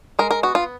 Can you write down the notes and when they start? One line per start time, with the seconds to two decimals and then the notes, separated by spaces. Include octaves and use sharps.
0.19 G#3 A#4
0.31 A#4
0.43 B3 F#4
0.55 F4